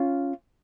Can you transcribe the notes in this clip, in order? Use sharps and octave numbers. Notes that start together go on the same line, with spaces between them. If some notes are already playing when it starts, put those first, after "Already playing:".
Already playing: C#4 F4